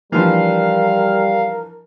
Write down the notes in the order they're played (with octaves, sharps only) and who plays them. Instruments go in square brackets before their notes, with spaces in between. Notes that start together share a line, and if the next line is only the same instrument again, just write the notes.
[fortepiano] E3 F3 D4 [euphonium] G3 [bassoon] A#4 [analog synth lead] F5